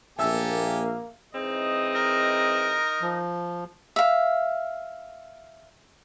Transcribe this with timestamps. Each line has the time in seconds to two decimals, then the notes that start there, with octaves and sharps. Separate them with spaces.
0.19 A#1 A#3 G4 A4 E5 G#5 E6
1.34 E3 G#3 C4 D#4 D#5
1.96 A#4
3.02 F3
3.96 E5 F5